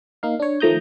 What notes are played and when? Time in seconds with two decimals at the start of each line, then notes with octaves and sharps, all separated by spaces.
0.23 A#3 D#4 F5
0.40 D4 C#5
0.60 D#3 F3 A3 A#5 D#6 G6